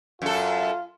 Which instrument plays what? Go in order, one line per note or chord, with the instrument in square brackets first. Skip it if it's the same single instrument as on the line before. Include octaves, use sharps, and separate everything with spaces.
[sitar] F#2 A4 [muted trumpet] F4